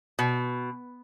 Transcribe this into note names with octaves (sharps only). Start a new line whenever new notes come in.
B2